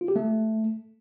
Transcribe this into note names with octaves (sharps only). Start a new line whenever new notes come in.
F4
G4
A3